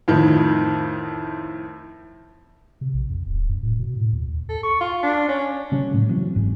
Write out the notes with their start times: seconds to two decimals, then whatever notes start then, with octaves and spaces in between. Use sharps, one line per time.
0.08 F2 A2 D#3
2.81 C3
2.94 A#1
3.10 F2
3.27 D1
3.49 F#2
3.63 A2
3.79 B2
3.97 A2
4.13 D#2
4.28 D#2
4.49 A4
4.63 C#6
4.81 F4
5.03 D4
5.29 C#4
5.72 C#3 G3 C#4
5.93 A2 F#3 G#3
6.09 C#3 E3 F#3 C4
6.35 F#1 G#2